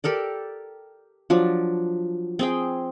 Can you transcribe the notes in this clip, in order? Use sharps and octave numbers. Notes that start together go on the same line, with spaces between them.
G4 A4 A#4 D5
F3 F#3 D4
C4 G#4 G5